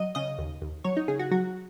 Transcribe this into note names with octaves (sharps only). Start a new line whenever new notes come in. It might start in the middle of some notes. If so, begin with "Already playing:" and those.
Already playing: F#3 D#5
C#3 D#5
D#2
D#2
F#3 C#5
D#4
C#3 G#4
F#4
F#3 F#4